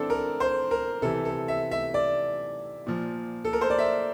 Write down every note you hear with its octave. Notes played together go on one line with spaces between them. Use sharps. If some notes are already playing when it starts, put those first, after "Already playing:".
Already playing: E3 C4 D4 A4
A#4
C5
A#4
C3 E3 A4
A4
E5
E5
D5
A#2 F3
A4
A#4
C5
D5
E5